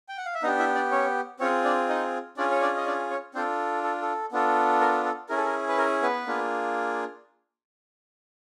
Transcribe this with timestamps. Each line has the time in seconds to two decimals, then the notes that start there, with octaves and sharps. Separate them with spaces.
0.09 G5
0.18 F#5
0.26 F5
0.35 E5
0.43 B3 D4 D#4 G4 D#5
0.59 E4 E5
0.75 D4 D5
0.91 C#4 C#5
1.40 C4 C#4 F4 G#4 C#5
1.65 D4 D5
1.89 D#4 D#5
2.37 C#4 D4 F4 G#4 D5
2.51 C#5
2.62 D4 D5
2.77 D#5
2.86 D4 D5
3.10 C#4 C#5
3.34 C4 D4 F4 A4 C5
3.83 A4
4.02 A4
4.32 B3 D4 F4 A4
4.81 A#4
5.05 A4
5.29 C#4 E4 G#4 A#4
5.37 A4
5.45 A#4
5.68 B4
5.78 A#4
6.02 B3 B4
6.27 A#3 D4 F4 G#4